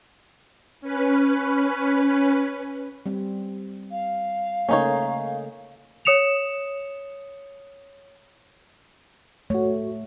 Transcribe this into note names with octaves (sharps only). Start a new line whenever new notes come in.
C#4 B4
G3 C4
F5
C#3 A3 A#3 C#4 D#4 C#5
C#5 D#6 C#7 E7 F7
A3 F#4 C#5